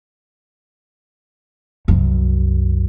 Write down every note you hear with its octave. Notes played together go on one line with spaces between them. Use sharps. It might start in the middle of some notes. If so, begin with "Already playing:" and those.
C2 F#2